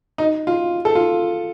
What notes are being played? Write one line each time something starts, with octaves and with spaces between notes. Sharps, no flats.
D#4
F4
A4
F4